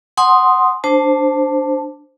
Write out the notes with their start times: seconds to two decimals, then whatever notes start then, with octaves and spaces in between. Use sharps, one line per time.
0.17 F#5 G#5 C6 D#6
0.84 D4 C5 A5